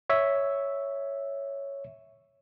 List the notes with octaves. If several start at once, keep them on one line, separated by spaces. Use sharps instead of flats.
C#5 E5